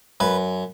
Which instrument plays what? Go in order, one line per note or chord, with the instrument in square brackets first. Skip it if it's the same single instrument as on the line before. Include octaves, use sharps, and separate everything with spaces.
[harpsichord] F#2 B4